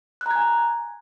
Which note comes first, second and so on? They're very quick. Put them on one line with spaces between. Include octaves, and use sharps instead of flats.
F#6 A#5 G#6 G#5